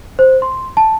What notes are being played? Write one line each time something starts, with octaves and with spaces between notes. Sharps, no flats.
C5
C6
A5